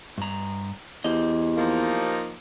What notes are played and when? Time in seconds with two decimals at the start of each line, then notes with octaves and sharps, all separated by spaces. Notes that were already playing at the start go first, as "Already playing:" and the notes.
0.18 G2 A#5
1.04 E2 G4 C5 D#5
1.56 F3 A#3 D#4